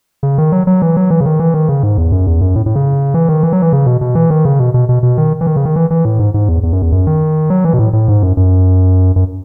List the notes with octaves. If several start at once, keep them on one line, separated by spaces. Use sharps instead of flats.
C#3
D#3
F#3
F#3
E3
F#3
E3
C#3
D#3
E3
D#3
C#3
G#2
E2
F#2
E2
F#2
A2
A2
C#3
E3
D#3
E3
F#3
E3
C#3
B2
B2
E3
D#3
C#3
B2
B2
B2
B2
D#3
E3
D#3
C#3
D#3
E3
E3
A2
G#2
G#2
E2
E2
F#2
E2
F#2
D#3
F#3
E3
B2
A2
A2
G#2
F#2
F#2
F#2